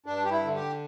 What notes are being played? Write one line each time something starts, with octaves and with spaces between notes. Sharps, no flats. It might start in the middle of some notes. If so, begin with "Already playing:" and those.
G2 D4
G4
E4
D3
G4